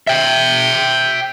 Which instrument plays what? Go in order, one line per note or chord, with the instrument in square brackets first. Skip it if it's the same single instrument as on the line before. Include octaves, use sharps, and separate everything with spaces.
[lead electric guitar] E5 G5